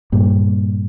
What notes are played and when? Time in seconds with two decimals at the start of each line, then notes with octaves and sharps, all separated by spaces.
0.12 G2 A#2